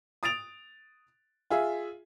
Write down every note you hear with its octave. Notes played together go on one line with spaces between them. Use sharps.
D#6 A6 D7 F7
F4 G#4 E5